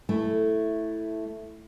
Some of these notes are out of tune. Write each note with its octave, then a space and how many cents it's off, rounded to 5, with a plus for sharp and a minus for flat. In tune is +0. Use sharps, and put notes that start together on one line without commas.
A3 +0 E4 +0